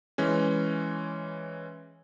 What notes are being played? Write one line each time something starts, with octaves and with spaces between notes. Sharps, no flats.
E3 G#3 C#4